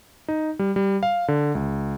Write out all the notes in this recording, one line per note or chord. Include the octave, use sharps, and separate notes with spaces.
D#4
G3
G3
F5
D3
C#2